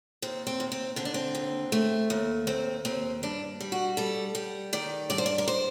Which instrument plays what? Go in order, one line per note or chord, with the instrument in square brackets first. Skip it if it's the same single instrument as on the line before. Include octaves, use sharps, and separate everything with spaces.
[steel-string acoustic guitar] D#2 C4
C4
D#2
C4
D3 C4
D4
C4
D#2
A3
D#2
D#2 C4
D#2 C4
G2 D4
G3
F#4
G3 A4
G3
D#3 D5
G2 D5
C5
D5
A#4
C5